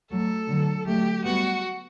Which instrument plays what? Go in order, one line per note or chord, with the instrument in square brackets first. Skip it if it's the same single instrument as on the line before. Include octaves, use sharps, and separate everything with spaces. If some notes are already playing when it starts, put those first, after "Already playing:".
[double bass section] F#3 A3 [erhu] A4
[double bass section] D3 F#3
[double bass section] F#3 A3 [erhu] G4
[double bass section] G3 B3 [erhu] F#4